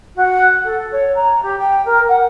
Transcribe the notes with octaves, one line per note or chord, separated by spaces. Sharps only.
F#4
A4
C#5
A#5
G4
G5
A#4
F#5